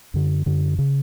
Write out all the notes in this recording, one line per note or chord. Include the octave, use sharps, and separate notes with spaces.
F#2 D3
F#2 D3
C#3